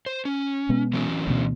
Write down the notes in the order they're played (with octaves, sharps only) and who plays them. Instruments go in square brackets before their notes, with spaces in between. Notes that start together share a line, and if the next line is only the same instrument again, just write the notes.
[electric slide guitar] C5
C#4
[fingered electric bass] B2 G#3 B3
[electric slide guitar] E3 F#3 C#4
[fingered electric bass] D2 B2